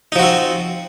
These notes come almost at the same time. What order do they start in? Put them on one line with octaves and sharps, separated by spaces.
D#4 F3 F#4 C4